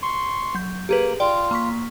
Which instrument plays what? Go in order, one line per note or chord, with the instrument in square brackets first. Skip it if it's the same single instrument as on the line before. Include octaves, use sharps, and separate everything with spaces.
[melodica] C6 C#6
[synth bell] F#3 G6
[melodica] A#3 [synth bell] G4 G#4 B4
[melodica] F4 [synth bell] D5 G5
[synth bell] A#3 C#6 B6